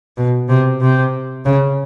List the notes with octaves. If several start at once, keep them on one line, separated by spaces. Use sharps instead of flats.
B2
C3
C3
C#3